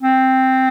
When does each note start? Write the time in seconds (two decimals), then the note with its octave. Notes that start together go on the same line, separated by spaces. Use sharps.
0.03 C4